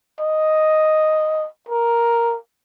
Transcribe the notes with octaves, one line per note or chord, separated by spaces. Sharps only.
D#5
A#4